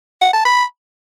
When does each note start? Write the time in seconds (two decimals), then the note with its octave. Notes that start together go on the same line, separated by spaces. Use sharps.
0.21 F#5
0.33 A5
0.45 B5